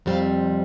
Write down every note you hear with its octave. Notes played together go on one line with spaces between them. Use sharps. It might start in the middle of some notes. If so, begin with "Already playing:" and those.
F2 C3 G3 C4 F5